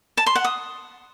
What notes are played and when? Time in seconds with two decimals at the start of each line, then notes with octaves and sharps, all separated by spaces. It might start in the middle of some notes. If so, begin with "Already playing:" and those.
0.17 A5
0.26 C6
0.35 F#5
0.44 D#6